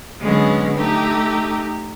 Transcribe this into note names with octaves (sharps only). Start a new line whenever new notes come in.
D3 F#3 G#3 B3 C#4
A3 D#4 G4